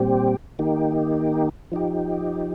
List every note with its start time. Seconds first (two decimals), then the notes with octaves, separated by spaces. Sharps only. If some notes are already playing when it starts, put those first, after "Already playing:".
Already playing: A#2 G3 C4 G4
0.59 D#3 A#3 D#4 G4
1.72 F3 D#4 G4